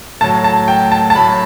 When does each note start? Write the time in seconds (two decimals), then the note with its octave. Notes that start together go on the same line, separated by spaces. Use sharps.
0.21 A2 F#3 A5
0.44 A5
0.68 G5
0.92 A5
1.10 A5
1.15 A2 F#3 B5